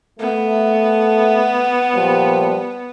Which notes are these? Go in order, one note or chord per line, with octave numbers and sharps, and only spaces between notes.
A3 B3
A#2 F3 G3